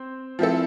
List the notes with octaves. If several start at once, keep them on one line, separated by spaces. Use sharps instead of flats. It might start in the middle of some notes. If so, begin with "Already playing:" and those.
Already playing: C4 C5
F3 C4 E4 A4